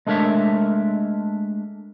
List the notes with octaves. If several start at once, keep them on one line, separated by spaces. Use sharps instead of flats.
G#3 A3 D4 A#4 C#5 E5